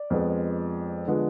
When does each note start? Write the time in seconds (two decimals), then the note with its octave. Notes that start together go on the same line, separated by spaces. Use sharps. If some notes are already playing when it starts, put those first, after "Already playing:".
Already playing: D5
0.10 F2 F3 G#3 B3
1.07 D3 F3 G#3 B3